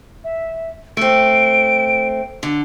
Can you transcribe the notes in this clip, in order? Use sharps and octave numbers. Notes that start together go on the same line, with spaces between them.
E5
A3 C4 D7
D3